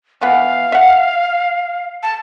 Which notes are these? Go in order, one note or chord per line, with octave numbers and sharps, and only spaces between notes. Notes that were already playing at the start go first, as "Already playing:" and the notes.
E3 F3 B3 F5
E5 F#5
A5